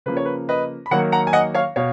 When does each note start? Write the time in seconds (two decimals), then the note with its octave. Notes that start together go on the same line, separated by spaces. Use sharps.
0.06 C#3 F3 A#3 B4
0.17 C#5
0.25 B4
0.49 B4 D#5
0.86 B5
0.91 D#3 F#3 A#3 F#5 A#5
1.12 F#5 A#5
1.27 G#5
1.33 D#5 F#5
1.54 C#5 F5
1.76 B2 C#5 F5